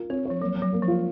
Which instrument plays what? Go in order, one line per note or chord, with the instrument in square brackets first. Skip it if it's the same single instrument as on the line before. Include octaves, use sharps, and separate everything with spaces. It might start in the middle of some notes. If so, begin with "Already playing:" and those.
Already playing: [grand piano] F4 A#4
[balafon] C4 [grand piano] C#5
[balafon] F3 [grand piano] C#5
[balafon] F#3 [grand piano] A#3
[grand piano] A#3
[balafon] F#3
[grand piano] A#3
[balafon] F3
[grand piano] F4